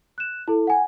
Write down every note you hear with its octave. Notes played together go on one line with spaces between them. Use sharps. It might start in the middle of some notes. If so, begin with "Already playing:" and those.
F#6 E7
E4 A4
F#5 G#5